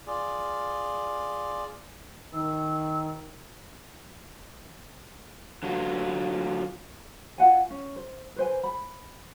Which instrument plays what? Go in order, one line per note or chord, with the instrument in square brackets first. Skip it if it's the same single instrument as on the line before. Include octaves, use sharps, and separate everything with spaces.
[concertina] F4 G#4 D5
[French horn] D#3 [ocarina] E6
[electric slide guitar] D3 F#3 F4
[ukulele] F4 F5 F#5 G#5
C#4
C5
B4 C5 G#5
B5